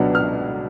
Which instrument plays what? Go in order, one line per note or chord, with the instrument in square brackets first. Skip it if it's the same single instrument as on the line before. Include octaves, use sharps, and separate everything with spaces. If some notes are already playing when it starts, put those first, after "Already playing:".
Already playing: [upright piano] C#2 B2 F#3 B3 D4
F6